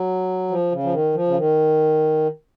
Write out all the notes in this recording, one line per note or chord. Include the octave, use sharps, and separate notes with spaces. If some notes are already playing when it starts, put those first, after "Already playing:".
Already playing: F#3
F3
C#3
F3
D#3
F3
C#3
D#3